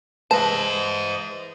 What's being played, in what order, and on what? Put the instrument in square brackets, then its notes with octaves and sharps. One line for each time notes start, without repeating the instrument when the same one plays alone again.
[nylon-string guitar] E3 G#3 B4 [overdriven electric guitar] C5 D#5 [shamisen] A5